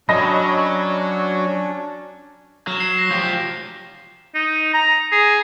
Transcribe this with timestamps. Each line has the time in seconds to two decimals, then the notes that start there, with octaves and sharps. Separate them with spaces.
0.09 F#3 C#4 D4 D#5 B5 A#6
2.67 F#3 F6 E7
2.80 C7
2.98 A#6
3.11 F3 G4 E7
4.35 D#4
4.74 A#5
5.12 G#4